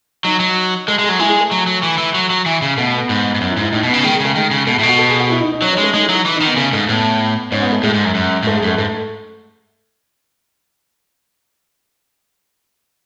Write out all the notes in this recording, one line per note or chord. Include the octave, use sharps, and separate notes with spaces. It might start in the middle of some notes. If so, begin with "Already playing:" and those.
F#3 D#4
F#3
G#3 A4
G#3 G#4
F#3
G#3 E4
G#4
A3
F#3
F#3
E3
E3
F#3
F#3
E3
C#3
B2 A3
B3
G#2
G#2
F#2 C#4
E4
G#2
E4
A2 D#4
B2
C#3 B3
D#3 G#3
G#3
C#3 A3
D#3 G#3
C#3
B2 A3
A2
B2
F#4
A4
G#4
F#4
E4
D#4
D#4
F#3 C#4
G#3 C#4
A3
G#3 D#4
F#3 E4
D#4
E3
D#4
D#3
B3
C#3 A3
G#2 A3
A2 B3
G#2 C#4
B3
A3
A2 G#3
G#2
F#2
F#2
A2
G#2 A3
F#2 G#3
A3
G#2 A3